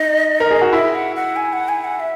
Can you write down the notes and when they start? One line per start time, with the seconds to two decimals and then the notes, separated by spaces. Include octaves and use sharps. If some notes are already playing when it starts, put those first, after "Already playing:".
Already playing: D#4 D#5
0.40 A#4
0.51 G#4
0.62 F#4
0.73 E4 E5
0.95 F#5
1.16 F#5
1.36 G#5
1.53 F#5
1.68 G#5
1.84 F#5
2.00 E5